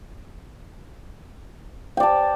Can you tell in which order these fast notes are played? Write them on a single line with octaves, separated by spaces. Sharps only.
G5 D5 A5